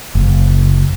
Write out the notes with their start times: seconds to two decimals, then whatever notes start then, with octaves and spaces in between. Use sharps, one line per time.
0.15 F#1